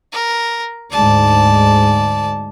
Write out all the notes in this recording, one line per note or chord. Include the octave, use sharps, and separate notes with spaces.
A#4
D2 G#2 D5 A5